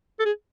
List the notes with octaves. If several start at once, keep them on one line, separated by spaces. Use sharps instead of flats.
A4
G#4